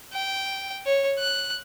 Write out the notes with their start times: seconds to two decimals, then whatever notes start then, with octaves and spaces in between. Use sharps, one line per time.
0.14 G5
0.86 C#5
1.19 F#6